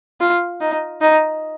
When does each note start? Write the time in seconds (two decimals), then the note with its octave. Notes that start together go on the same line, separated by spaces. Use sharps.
0.20 F4
0.61 D#4
1.01 D#4